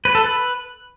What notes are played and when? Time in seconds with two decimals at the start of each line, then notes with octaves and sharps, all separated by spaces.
0.05 B4
0.15 A4
0.24 B4